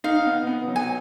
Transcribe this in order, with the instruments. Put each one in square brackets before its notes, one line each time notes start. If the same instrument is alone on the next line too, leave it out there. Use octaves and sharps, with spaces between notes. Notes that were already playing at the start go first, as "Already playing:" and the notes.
[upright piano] D#4 [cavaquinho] F5
[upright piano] B3
B3
F#3
[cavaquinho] G#5